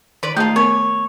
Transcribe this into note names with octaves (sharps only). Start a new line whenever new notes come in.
D#3 B4 D5 C6
A3 D#4 F4 G#4 A5
B3 A#4 C#5